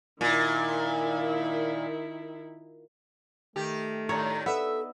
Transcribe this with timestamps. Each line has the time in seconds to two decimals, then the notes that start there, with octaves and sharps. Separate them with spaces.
0.21 A#2 D#3 E4
3.56 D#3 A3 G4
4.09 A2 D#3 D4 C#5 A#5
4.46 B3 A4 E5